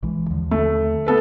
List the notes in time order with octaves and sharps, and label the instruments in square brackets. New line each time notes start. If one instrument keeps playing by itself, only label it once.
[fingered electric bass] A#1 E3 G#3
D#2 D3 F3
[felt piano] A3
B3 A4 B4